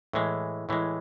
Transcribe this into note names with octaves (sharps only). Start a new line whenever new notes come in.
A2 E3 G#3
A2 E3 G#3